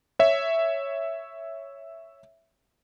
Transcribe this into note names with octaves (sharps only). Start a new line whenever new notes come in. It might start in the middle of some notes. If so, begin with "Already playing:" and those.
C#5 E5